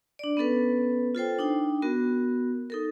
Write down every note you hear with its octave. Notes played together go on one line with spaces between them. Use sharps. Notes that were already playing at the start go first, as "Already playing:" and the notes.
D4 D5
B3 C#4 A4 B4
F4 A4 C5 G5
D4 D#4 G5
B3 F#4 A#4
D#4 A4 A#4